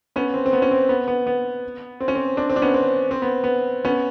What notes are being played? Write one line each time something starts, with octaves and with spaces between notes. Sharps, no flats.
B3 C#4
C4
C4
B3
C#4
C4
B3
B3
B3
C4
C#4
C4
C4 D4
C4
D4
B3 C#4
C4
C4
B3
B3
B3 C#4